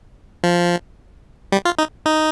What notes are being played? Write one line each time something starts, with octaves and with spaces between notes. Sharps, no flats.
F3
G3
F4
D#4
D#4